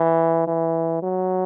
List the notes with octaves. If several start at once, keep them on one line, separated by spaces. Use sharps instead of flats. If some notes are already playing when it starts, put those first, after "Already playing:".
Already playing: E3
E3
F#3